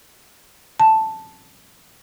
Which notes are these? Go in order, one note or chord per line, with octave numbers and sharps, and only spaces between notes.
A5